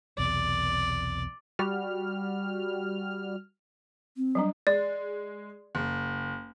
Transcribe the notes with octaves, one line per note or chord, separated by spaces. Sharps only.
B1 E2 C3 D5
G3 F#4 F6
C4
F#3 G3 D4
G#3 D5
F#1